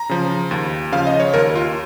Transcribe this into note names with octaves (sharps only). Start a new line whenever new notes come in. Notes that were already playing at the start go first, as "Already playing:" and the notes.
Already playing: A#5
C#3 F3
D#2
C#3 F3 F5
D#5
C#5
D#2 A#4
F4